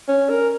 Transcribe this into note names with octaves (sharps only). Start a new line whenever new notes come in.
C#4
A#4